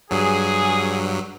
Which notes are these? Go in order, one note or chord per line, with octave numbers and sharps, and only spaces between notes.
G2 F#3 G#4